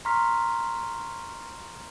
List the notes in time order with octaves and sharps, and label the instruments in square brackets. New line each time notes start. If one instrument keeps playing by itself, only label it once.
[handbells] A#5 C6 C#6 F6 B6